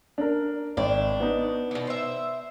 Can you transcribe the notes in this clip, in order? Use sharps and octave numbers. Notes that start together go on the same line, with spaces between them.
D4 A#4
G#1 D4
B3 D#4
B2 E3
C5 E5